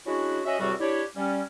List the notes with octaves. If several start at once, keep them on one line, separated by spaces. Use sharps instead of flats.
G#3 C#4 D4 E4 F#4
C#4 F#4 D#5 E5
E2 A2 C3 G3 C4 F#4
D4 E4 G4 C#5
G3 C#4